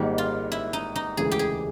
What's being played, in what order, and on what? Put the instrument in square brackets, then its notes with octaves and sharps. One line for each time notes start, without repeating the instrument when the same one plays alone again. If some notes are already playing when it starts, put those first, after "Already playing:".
Already playing: [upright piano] G#1 G#2 D#3 G3 A#3 [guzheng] G4
[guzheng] F4
E4
D#4
D#4
[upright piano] E1 D2 C#3 E3 G#3 [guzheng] G#4
[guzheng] G4
G#4